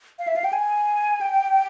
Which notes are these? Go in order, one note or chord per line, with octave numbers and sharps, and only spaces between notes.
F5
E5
F5
G5
G#5
G5